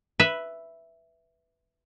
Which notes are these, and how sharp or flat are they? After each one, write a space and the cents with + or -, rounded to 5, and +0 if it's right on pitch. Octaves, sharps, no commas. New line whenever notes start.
B4 +0 E5 +0